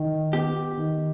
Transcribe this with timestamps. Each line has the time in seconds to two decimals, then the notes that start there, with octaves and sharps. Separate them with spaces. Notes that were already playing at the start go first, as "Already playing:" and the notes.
Already playing: D#3
0.33 B3 G4
0.77 D#3